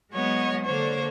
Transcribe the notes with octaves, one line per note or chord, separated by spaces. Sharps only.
F#3 G#3 B3 C#5 D#5 F#5
D3 A#3 D4 C5 C#5